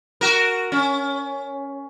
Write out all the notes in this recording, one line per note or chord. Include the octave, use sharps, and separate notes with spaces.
F#4 A#4
C#4